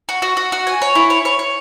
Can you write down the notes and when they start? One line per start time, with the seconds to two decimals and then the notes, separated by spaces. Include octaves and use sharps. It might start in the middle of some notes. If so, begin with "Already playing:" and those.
0.09 F#4
0.22 F#4
0.37 F#4
0.52 F#4
0.67 G#5
0.82 C#5
0.95 E4
1.10 C#5
1.25 C#5
1.39 C#5